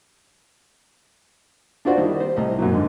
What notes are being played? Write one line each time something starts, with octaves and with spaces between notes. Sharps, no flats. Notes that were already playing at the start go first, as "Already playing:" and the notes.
D4 F4 F#4 C5 D5
D#3 G3 E4
C5
C2 A2 D#5
F#2 A#2 F#3
G#2 D3 A#3